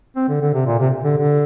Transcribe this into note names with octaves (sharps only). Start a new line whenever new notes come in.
C4
D3
D3
C3
A#2
C3
D3
D3